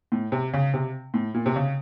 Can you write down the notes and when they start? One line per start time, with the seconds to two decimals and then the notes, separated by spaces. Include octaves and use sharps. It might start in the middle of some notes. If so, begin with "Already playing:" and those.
0.12 A2
0.32 C3
0.53 C#3
0.74 C3
1.14 A2
1.34 A#2
1.46 C3
1.56 C#3